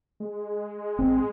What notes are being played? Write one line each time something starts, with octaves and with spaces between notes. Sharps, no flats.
G#3
A1 C4